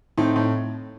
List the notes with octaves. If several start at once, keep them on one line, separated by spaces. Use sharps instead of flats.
A2 C4 D#4
A2